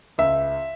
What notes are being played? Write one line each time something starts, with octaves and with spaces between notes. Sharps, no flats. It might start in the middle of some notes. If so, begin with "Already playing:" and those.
C#2 E5